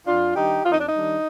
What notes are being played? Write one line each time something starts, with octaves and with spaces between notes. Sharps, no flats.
F2 D4 F4
D#3 G3 D4 D#4 G4
F2 F4
D#4
D4
D#4
D#3 G3 D4